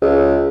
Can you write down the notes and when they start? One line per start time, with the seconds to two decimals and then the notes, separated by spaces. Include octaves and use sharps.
0.01 C#2